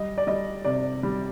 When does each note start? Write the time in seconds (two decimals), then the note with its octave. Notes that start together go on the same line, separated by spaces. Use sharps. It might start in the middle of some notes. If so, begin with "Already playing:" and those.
Already playing: G3 D#5
0.18 D5
0.27 G3 D#5
0.65 C3 D5
1.03 G3